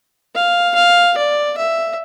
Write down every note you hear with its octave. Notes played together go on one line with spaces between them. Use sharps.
F5
F5
D5
E5